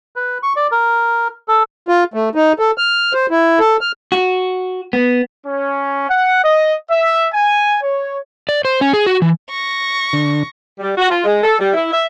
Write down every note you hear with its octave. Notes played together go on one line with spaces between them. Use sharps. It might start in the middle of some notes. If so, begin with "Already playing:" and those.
B4
C#6
D5
A#4
A4
F4
A3
D#4
A4
F6
C5
E4
A4
F6
F#4
B3
C#4
F#5
D#5
E5
G#5
C#5
D5
C5
C#4
G#4
F#4
E3
C#6 A#6
D3
G3
F#4
F4
G#3
A4
G3
E4
E5